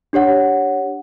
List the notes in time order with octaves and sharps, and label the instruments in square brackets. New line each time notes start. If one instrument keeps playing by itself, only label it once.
[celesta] D4 G4 C#5 F#5